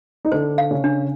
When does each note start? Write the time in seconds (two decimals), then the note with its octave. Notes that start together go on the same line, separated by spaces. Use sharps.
0.25 D#4
0.32 D3 D4 C5
0.58 F5
0.71 C#3 C#4
0.84 D4